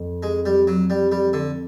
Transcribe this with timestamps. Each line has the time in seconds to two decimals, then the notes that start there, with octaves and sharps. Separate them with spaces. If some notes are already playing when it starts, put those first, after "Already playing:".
Already playing: F2
0.23 G#3
0.45 G3
0.67 F#3
0.90 G3
1.12 G3
1.33 D3